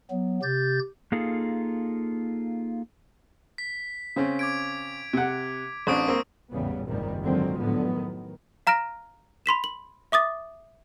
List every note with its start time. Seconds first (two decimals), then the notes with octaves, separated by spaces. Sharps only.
0.10 F#3 B3
0.42 C3 G4 G6 A6
1.12 A#3 D#4 F4 G#4 A4
3.58 B6
4.16 C#3 C4 C#4
4.39 D6 G#6 D7
5.13 C3 F#5
5.87 A1 C4 D4 C#6 D#6 D7
6.08 A#3 C4
6.51 G#1 E2 A2 C#3 G3 B3
6.87 F#1 C#2 G#2 C3 D#3 G3
7.22 D3 D#3 F3 F#3 G#3 C4
7.59 A2 D3 F#3 B3
7.94 D#3
8.67 F5 A#5 F6 A#6 D7
9.46 B5 C6 B6 E7
9.64 F#7
10.12 E5 D6 D#6 A6